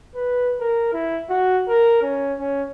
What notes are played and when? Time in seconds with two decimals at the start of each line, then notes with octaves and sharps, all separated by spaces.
0.15 B4
0.60 A#4
0.93 E4
1.29 F#4
1.69 A#4
2.02 C#4
2.39 C#4